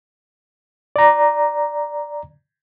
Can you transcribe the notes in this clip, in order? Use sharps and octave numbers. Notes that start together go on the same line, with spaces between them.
D5 A#5